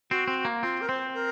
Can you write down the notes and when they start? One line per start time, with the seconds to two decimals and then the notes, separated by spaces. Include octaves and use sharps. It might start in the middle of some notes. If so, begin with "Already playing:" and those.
0.10 C4 F#4
0.28 C4
0.45 A#3
0.62 C4 F4
0.81 A#4
0.89 C4 C5
1.14 A#4